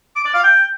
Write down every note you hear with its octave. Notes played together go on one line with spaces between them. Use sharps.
D6
D5
F5
G5